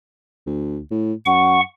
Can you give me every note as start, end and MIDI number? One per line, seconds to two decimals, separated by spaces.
0.46 0.80 38
0.91 1.13 45
1.26 1.59 42
1.26 1.60 78
1.26 1.60 85